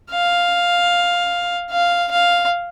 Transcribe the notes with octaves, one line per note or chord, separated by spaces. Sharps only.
F5
F5
F5